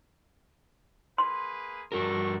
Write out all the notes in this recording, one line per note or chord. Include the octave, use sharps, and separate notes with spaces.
A#3 G#4 B4 C6
G2 A3 D4 F#4 A#4 C#6